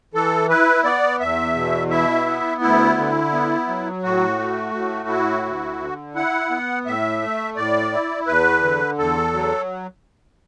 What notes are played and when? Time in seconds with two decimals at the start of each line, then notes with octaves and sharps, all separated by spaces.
0.14 E3 A4
0.49 E4 B4
0.84 B3 D5
1.20 E2 E5
1.55 B2
1.90 E4 E5
2.26 B3
2.61 D2 E4
2.98 D3
3.33 B3
3.67 F#3
4.03 A2 F#4
4.38 A3
4.74 A2
5.09 E4
5.45 D2
5.79 D3
6.15 E4 F#5
6.50 B3
6.85 A2 E5
7.21 A3
7.56 A2 D5
7.93 E4
8.27 E2 B4
8.62 D3
8.98 E2 A4
9.33 F#3